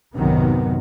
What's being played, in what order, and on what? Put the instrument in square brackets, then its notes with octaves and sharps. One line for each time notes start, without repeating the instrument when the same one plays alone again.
[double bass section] B1 F#2 A2 C3 D#3 B3